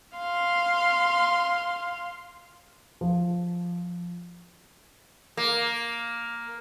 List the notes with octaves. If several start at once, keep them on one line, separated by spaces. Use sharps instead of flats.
F5 C6
F3
A#3